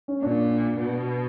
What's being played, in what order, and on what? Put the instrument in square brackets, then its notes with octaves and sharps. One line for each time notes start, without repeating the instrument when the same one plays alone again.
[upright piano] C#4
[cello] A#2 [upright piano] D4
[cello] B2